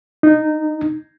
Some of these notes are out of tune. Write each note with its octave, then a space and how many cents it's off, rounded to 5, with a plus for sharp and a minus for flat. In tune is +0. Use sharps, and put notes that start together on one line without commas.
D#4 -15